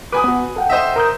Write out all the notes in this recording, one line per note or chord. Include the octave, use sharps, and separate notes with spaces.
B4 G#5 D6 D#6
B3 F#4
A4 F#5 G5
C5 D#5 E5
A#4 D#6 G6